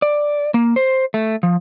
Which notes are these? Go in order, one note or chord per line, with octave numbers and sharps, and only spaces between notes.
D5
A#3
C5
A3
F3